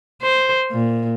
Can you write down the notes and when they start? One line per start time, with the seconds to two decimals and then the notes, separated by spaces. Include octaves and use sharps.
0.22 C5
0.71 A#2